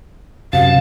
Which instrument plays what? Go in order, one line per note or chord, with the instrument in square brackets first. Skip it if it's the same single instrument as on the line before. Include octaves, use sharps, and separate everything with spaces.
[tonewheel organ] F#2 C3 A5 [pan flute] F5